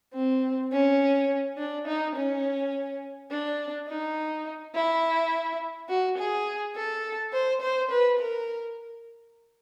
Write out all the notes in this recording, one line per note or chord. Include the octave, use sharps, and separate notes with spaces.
C4
C#4
D4
D#4
C#4
D4
D#4
E4
F#4
G#4
A4
C5
C5
B4
A#4